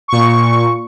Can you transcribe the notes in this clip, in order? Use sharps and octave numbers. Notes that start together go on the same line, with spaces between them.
A#2 C#6